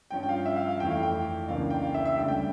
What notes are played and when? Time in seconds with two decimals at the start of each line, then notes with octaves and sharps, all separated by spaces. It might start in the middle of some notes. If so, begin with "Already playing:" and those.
0.11 G2 F3 C#4 G5
0.23 G5
0.29 F5
0.46 E5
0.56 F5
0.68 F5
0.80 F2 E3 A3 E4 G5
0.90 F5
1.03 G5
1.48 C#2 C#3 E3 A#3 D4 F5
1.70 G5
1.82 F5
1.94 E5
2.05 E5
2.17 D2 C#3 G3 D4 G5
2.28 G5